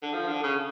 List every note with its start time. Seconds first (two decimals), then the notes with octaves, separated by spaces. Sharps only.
0.02 D3
0.13 F3
0.28 D3
0.43 C#3